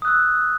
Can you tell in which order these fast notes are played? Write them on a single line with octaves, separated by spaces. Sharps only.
D#6 F#6 E6